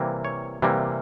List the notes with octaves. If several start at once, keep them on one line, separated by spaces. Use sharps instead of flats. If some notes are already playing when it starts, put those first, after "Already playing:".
Already playing: C3 E3 G3 A#3
C#5
C3 E3 G3 A#3